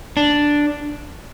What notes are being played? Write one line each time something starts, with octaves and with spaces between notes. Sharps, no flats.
D4